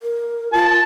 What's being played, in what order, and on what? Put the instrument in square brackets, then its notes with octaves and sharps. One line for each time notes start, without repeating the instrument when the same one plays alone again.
[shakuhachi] A#4
[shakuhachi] F4 [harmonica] A5